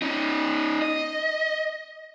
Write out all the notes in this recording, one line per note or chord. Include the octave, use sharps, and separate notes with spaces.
C#4 D#4
D#5